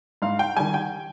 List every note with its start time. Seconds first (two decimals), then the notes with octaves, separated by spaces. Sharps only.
0.22 G#2 F5
0.39 G5
0.56 D#3 G3 G#5
0.74 G5